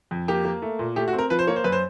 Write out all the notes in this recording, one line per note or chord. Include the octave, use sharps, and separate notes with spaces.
F2
A#3 G4
A#3
A3
A#2
A3 G4
F#4
C4
A#4
F3 B4
C5
A#3 C#5
C5
F#2 B4
C5